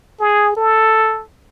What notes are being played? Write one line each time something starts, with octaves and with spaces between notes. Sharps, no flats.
G#4
A4